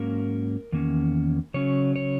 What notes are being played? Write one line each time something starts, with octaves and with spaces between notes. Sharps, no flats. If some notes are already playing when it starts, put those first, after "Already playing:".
Already playing: G#2 F#3 A#3 C#4 A#4
E2 D#3 A#3 C#4
C#3 F#3 C#4 C#5
C#5